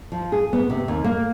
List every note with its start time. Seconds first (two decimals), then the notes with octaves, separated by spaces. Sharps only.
0.12 F3
0.32 G#4
0.53 B3
0.70 C3
0.88 D#2
1.04 A#3